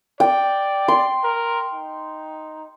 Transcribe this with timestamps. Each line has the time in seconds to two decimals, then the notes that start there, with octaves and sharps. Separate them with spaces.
0.20 D5 G5
0.88 C6
1.24 A#4
1.73 D#4